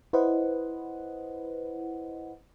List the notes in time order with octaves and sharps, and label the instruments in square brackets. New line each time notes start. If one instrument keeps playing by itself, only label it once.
[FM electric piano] E4 B4 C5 D#5 F#5